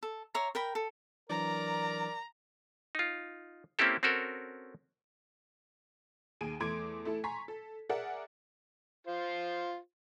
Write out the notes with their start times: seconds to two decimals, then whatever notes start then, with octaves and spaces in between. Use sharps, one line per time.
0.03 A4
0.34 C#5 E5 A#5 C6
0.55 A#4 G5 B5
0.75 A4
1.30 E3 F#3 D4 A#4 D5 A#5
2.95 D#4 F4
3.79 A#3 C4 C#4 E4 G4 A4
4.03 C4 C#4 F#4 A4 A#4
6.41 D#2 G#4 D7 D#7
6.60 E2 A3 C6 D6 G#6 D7
7.05 A3 E4 A4
7.24 G#5 A#5 C6 C#6 B6
7.48 A4
7.89 G#4 A#4 D5 E5 F#5
9.07 F4 C5